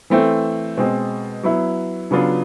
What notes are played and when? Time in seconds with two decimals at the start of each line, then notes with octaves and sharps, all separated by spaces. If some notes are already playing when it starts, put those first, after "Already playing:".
0.10 E3 A3 C4
0.77 B2 G#3 C4
1.43 F#3 B3 E4
2.11 C#3 F#3 B3 D4 F4